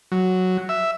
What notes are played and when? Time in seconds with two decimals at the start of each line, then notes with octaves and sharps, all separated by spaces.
0.12 F#3
0.69 E5